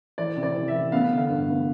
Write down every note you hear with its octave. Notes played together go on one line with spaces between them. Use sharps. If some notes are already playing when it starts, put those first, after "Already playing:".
E3 D5
C3
D5
E3
E5
E3
B3 F5
D3
F5
G2
B3